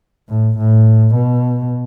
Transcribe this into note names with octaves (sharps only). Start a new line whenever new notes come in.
A2
A2
B2